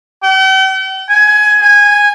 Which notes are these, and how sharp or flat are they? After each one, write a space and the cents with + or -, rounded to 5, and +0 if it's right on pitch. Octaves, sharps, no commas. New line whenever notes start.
G5 -45
G#5 +20
G#5 -10